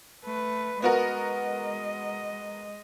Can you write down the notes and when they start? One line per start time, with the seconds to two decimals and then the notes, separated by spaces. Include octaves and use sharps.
0.25 A3 B4
0.82 G#3 B3 F#4 A#4 D#5